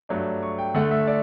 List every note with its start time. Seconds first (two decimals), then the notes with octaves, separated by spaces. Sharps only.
0.09 G2 F#3 A3 D4
0.43 C#6
0.59 G5
0.74 D2 D3 A3 F#5
0.91 E5
1.07 D5